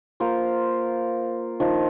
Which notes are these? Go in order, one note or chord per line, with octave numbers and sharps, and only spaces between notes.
A#3 F4 A#4 C5
D#3 F3